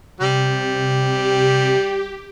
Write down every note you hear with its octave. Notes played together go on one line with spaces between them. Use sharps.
C3 G3
G4